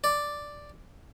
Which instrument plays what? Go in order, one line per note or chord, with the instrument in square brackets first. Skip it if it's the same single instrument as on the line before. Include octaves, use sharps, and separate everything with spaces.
[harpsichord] D5